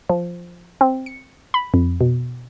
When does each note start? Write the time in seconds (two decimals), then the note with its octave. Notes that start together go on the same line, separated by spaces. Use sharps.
0.10 F3
0.81 C4
1.06 C#7
1.54 B5
1.74 F2
2.01 B2